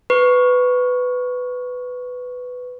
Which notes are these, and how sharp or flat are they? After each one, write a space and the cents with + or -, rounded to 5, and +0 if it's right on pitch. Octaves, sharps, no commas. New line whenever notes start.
B4 +10 C#6 +0